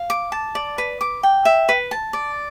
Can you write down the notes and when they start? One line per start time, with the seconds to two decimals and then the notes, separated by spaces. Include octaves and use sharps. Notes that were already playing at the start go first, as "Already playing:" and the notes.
Already playing: F5
0.10 D6
0.32 A5
0.55 D5
0.78 B4
1.01 D6
1.23 G5
1.45 E5
1.69 B4
1.91 A5
2.13 D5